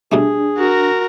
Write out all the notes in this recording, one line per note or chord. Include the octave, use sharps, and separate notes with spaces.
B2 G3 A3 D4 G#4
F#4 A#4